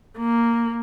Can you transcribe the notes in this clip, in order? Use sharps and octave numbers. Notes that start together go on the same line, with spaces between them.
A#3